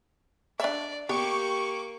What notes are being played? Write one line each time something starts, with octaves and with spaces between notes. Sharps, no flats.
D4 D5 E5
A#3 B3 G4 C#6 D6